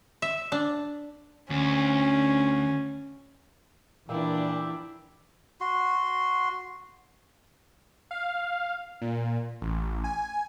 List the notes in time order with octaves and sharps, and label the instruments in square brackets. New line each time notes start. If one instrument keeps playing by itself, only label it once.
[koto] E5
D4
[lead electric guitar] D2 [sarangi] C#4
[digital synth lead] A#2 [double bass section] E3 [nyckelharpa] D4 E4 [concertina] G4 E5
[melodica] F#4 C6
[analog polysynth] F5
A#2
A1
G#5